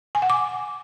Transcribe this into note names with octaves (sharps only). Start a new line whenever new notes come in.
G#5
F#5
D6